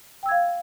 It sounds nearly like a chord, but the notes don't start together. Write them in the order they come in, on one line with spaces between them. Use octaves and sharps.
G5 E6 G#6 F5